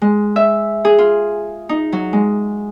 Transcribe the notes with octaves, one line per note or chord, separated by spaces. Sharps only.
G#3
E5
G#4
F4
D#4
F#3
G#3